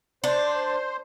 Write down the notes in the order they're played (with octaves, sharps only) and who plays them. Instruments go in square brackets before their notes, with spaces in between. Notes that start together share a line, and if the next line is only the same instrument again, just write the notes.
[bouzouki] D4 [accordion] C5